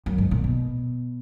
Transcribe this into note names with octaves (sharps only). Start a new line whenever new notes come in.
F#2
G#2
A#2
B2